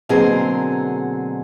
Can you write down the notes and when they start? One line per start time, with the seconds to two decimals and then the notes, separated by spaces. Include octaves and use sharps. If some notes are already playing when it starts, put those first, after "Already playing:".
0.09 B2 D3 F#3 A#3 C4 G#4